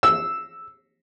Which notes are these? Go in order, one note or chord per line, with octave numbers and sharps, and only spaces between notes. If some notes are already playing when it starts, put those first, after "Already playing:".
E6